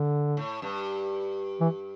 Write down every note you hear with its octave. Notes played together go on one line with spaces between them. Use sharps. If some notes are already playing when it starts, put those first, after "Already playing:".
Already playing: D3
A2
G2
E3